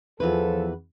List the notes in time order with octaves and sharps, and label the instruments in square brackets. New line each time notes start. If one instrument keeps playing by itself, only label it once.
[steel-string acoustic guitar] E2 E3 B4 [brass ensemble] F3 A4